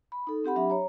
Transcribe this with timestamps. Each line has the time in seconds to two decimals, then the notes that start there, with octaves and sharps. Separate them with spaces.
0.12 B5
0.27 D#4 A4
0.44 C4 G4 F#5 B5
0.56 F#3 D4 G4 E5 B5
0.70 C#5 A#5